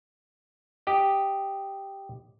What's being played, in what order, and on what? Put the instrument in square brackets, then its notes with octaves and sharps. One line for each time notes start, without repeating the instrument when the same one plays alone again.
[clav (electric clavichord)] G4 D#5